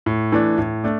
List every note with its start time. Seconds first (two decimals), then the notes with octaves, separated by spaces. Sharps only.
0.06 A2
0.32 E3 A3 D4
0.58 A2
0.84 A3 D4